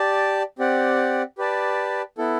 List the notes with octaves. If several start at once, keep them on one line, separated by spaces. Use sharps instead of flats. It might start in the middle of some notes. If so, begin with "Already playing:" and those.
Already playing: G4 D5 A5
C4 G4 D5 F#5
G4 B4 D5 A5
B3 E4 A4